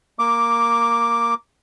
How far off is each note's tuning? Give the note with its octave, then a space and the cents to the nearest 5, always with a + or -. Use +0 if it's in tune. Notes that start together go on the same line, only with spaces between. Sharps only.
A#3 +0 D6 +0